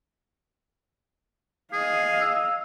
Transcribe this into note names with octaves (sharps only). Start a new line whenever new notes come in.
G#4 D#5 F5
E6